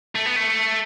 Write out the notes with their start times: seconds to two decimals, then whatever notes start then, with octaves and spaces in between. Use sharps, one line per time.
0.15 A3
0.26 B3
0.36 A3